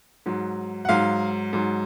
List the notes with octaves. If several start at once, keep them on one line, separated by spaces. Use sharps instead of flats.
G#2 F#3
F#5
G#2 F#3 F5
G#2 F#3